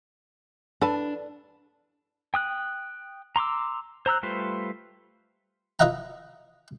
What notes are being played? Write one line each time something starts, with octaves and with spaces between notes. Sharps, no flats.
D4 A4 B4 A5
G5 D#6 F#6
A#5 C6 D6 E6
C5 A#5 E6 F#6
G3 A3 F4 B4 C5
F4 B4 D#5 E5 F#5 A#5